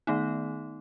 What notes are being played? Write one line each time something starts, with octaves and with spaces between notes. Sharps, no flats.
D#3 A3 B3 D#4